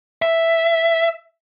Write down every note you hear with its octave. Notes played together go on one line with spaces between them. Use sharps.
E5